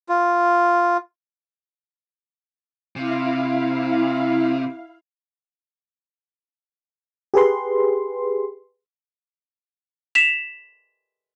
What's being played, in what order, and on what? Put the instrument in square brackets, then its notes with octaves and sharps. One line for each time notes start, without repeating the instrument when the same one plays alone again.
[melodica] F4
[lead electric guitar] C3 [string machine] E4 F5
[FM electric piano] G4 G#4 B4 C6
[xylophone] B6 E7 F7